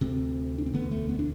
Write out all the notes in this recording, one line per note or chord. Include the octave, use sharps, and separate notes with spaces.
D2 C3 C4
D4
C4
E1 D2 D3 B3
A3
B3
D4